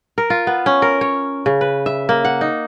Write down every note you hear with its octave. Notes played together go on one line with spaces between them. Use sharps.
A#4
F4
B3
C#4
A#4
C#5
C#3
B4
E5
A#3
F#5
D#4